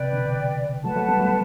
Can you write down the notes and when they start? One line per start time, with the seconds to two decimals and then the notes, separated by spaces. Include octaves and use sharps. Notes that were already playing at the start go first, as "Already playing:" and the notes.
Already playing: C3 B4 D5 G5
0.12 B2 D3
0.84 F#3 A3 B4 F#5 A5
0.96 F#3 A3
1.09 G3 B3
1.20 F#3 A3